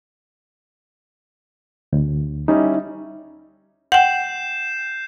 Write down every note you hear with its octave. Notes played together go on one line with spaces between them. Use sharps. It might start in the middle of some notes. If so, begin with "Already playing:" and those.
D2
G3 C#4 D#4 E4
F#5 G5 G6 C7 E7